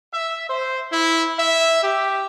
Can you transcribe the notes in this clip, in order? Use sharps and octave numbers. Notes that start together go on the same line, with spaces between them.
E5
C5
E4
E5
G4